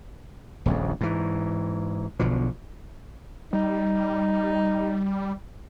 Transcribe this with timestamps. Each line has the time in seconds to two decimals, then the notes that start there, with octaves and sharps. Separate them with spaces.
0.66 D#1 A#1 F2
1.01 G#2 E3
2.20 B1 B2 D3 F3
3.53 G3 D#4